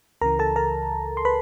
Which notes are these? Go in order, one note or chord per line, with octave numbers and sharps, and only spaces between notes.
C#2 C#3 E3 A#4 A#5
A4 A5
A#4 A#5
C6
B4 B5